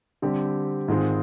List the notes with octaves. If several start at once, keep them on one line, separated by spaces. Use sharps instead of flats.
D3 G3 C4 G4
G#2 D#3 G#3 C4 F4